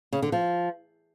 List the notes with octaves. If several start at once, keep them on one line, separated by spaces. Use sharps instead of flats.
C#3
D3
F3